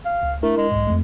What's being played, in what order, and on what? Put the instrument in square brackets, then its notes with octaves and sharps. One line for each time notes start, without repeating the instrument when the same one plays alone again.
[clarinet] F5
[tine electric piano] C#2
[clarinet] A3 [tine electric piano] D4 E4 A#4
[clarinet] G#3
[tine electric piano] B1 G#2
F2 A3